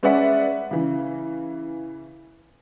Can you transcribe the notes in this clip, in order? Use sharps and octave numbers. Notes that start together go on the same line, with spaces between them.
G#3 C#4 B4 D5 E5 F#5
C#3 E3